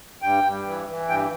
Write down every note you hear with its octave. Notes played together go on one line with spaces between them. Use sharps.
G2 G5
G2
E3
E3
G2 G5